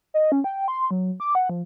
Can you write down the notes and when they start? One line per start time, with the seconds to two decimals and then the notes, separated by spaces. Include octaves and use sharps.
0.14 D#5
0.32 C#4
0.44 G5
0.68 C6
0.91 F#3
1.20 D6
1.35 F#5
1.50 F3